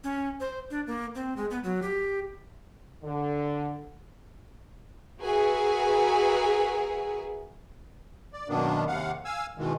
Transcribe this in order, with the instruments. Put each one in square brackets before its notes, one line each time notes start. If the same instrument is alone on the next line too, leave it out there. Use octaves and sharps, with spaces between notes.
[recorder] C#4
C5
D4
A#3
C4
G#3
B3
F#3
G4
[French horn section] D3
[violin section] F#4 G#4 A#4 B4 E5 G#5
[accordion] D5
F#2 B2 D#3 A#3 B3 D4
D#2 C3 F5 F#5
F5 G#5 E6
B2 D#3 E3 G#3